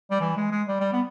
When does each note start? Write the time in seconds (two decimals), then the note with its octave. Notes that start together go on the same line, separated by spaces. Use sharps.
0.11 G3
0.21 E3
0.37 G#3
0.52 G#3
0.68 G3
0.80 G3
0.92 B3